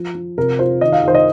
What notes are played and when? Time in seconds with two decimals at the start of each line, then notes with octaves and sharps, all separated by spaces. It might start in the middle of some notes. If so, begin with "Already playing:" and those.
Already playing: F3
0.15 F3
0.38 C3 A#4
0.59 F4 C5
0.81 D#3 D#5
0.92 F5
1.03 D#3 C5
1.15 D#5